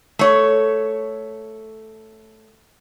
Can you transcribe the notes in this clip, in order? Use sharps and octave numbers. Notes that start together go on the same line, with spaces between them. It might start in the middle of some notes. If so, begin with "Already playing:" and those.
A3 C#5